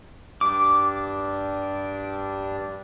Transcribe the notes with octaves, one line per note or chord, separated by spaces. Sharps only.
G2 G3 D4 D6